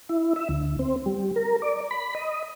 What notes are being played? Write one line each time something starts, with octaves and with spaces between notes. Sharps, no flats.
E4
E5
D2
C4
G3
A#4
D5
B5
D#5